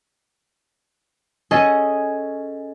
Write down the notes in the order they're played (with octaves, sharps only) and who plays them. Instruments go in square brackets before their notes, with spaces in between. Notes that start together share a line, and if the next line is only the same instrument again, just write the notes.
[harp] C#4 G#4 A4 D#5